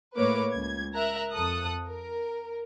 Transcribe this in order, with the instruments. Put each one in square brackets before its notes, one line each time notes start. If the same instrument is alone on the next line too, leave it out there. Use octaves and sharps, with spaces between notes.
[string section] A2 A#3 B4 C#5 D6
C#2 G#6
A#4 E5 A#5 F#6
F2 A4 D#6 F#6
A#4